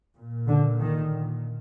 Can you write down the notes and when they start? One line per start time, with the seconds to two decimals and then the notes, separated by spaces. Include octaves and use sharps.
0.17 A#2
0.47 D3
0.80 D#3